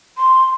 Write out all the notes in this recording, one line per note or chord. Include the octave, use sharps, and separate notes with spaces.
C6